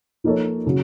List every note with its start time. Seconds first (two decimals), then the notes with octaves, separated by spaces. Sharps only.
0.24 F3 A#3 D#4 A4 C#5
0.66 C#3 F#3